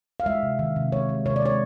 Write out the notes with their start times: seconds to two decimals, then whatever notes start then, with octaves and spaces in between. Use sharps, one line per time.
0.20 F5
0.26 G#3 E5
0.43 C3
0.59 D#3
0.76 C3
0.92 G#3 C#5
1.09 G#3
1.26 C3 C#5
1.36 D5
1.42 G#3 C#5